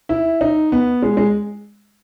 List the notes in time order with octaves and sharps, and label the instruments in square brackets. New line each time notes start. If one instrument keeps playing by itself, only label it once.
[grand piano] E4
D#4
B3
G#3
G#3